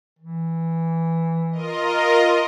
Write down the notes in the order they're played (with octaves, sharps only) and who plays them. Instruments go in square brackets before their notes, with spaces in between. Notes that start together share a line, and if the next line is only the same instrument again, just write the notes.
[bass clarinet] E3
[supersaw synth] F4 A#4 D#5